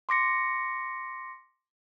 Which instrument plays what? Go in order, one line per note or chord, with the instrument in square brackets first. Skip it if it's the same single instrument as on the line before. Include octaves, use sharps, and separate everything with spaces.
[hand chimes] C6 D6 A#6 C#7